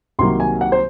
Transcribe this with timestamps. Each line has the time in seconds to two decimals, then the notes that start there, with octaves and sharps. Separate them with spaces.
0.19 C2 C3 D#3 F#3 A#3 C6
0.40 G#5
0.61 F#5
0.72 C5